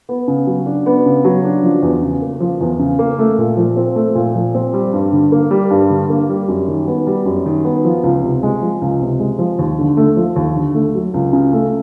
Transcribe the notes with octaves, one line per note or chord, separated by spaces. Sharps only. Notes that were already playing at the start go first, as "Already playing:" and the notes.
B3
C#3
F#3
D4
B3
C#3
F#3
D4
F3
E2
C#3
A#3
F3
E2
C#3
A#3
A3
A#2
F3
C4
A3
A#2
F3
C4
G3
G2
D3
A#3
G3
G2
D3
A#3
G3
F#2
D#3
B3
G3
F#2
D#3
B3
F3
C#2
C3
G#3
F3
C#2
C3
G#3
F3
D#2
D3
A3
F3
D#2
D3
A3
F#3
C#2
C#3
A3